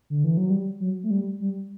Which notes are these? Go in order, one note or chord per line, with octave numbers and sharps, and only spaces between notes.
D3
E3
F#3
G3
F#3
A3
G3
G3